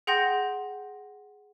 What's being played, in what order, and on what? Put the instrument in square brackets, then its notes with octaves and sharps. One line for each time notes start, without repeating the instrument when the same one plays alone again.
[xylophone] G#4 F#5 G5 C6 G6 A#6